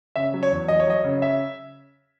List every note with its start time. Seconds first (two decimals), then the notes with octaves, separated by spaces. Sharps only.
0.16 C#3 E5
0.34 F#3
0.43 C#5
0.52 E2
0.68 F#3 D#5
0.80 C#5
0.87 F#3 D#5
1.04 C#3
1.22 E5